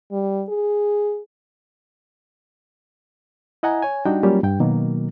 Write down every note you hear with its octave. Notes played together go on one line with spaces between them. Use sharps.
G3
G#4
E4 D#5 F#5 G#5 A#5
C#5 G#5
G3 D4 D#4 F#4 G5
F#3 G3 A#3 C#4 F4 G4
G2 G5
B2 D#3 F#3 A#3